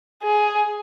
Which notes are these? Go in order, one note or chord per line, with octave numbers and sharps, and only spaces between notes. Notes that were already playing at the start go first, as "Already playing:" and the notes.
G#4